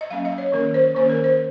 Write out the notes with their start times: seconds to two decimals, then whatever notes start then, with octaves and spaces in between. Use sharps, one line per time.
0.01 D#5
0.10 F#3 A#3 C#4 F5
0.25 D#5
0.38 C#5
0.52 D#3 A#3 C#4 A#4
0.74 C5
0.95 D#3 A#3 C#4 C5
1.10 A#4
1.24 C5